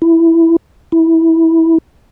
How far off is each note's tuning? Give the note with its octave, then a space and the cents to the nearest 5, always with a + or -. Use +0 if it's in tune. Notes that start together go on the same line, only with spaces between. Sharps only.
E4 +5
E4 -15